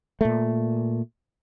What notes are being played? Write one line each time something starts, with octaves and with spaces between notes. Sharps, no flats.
A#2 A3